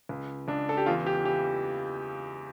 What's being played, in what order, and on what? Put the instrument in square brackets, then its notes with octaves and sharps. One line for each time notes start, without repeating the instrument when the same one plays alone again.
[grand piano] C#2
C#2 D4
A4
G4
E2 F4
G4
E3 G4